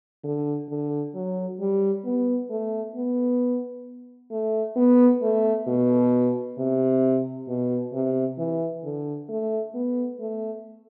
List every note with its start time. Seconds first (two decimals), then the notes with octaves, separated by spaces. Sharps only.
0.24 D3
0.70 D3
1.15 F#3
1.60 G3
2.05 B3
2.50 A3
2.95 B3
4.31 A3
4.76 B3
5.22 A3
5.67 B2
6.58 C3
7.48 B2
7.93 C3
8.38 E3
8.84 D3
9.29 A3
9.74 B3
10.20 A3